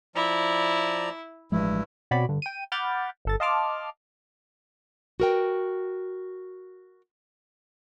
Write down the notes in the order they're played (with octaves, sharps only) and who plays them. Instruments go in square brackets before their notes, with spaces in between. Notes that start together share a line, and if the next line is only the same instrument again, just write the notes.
[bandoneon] F3 D5 A#5 [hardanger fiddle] E4
[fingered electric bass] A1 F3 G#3 [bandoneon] G2 E4
[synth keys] B2 C4 F#4 C#5 D5 B5
G2 D3
G5 D#7
F#5 B5 D6 F6 G6 A6
G1 A4 A6
D#5 F5 A5 C6 D6 F6
[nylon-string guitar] F#4 A#4 G5